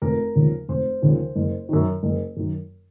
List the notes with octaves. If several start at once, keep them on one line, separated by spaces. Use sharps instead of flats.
F1 A#4
D#2 C#3 F3
F1 C5
D#2 C#3 F3
F#1
F#2 D#3
F#1
F#2 D#3